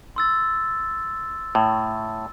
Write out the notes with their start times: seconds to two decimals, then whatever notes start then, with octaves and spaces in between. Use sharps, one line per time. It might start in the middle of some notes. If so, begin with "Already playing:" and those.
0.16 C6 E6 A6
1.55 A2